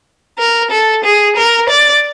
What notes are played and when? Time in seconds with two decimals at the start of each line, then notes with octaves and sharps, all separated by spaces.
0.39 A#4
0.71 A4
1.04 G#4
1.37 A#4
1.69 D5